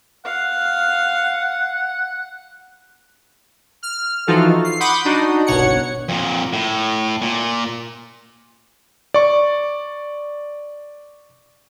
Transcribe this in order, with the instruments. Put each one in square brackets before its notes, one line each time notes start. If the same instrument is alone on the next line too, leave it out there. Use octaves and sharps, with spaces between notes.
[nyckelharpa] F5 [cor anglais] F#5
[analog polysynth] F6
E3 F3 D#4 F4 F#4 A4
C7
F#5 B5 C6 D6 D#6 G6
D4 D#4 F#4
G1 C2 B2 C#5 F#5 C#7
[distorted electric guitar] F2 A#2
A2
A#2
[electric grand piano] D5 C#6